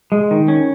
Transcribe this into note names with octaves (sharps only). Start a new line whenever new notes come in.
G#3
D#3
C#4